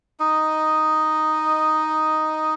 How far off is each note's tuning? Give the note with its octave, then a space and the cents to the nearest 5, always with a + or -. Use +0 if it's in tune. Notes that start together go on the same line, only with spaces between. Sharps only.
D#4 +0 D#5 +0